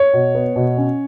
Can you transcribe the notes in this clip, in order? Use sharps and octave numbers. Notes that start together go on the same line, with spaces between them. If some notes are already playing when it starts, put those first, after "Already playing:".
Already playing: C#5
B2
B3
B2
C#4